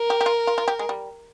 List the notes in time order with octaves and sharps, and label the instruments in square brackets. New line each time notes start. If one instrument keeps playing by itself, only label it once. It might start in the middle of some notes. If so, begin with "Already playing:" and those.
Already playing: [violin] A#4
[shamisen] G4
G4
F4
F4
F4
G4
G#3
G3